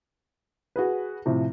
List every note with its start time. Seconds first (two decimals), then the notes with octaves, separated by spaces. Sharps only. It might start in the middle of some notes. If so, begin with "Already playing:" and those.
0.76 F#4 G#4 B4
1.26 A2 C3 F3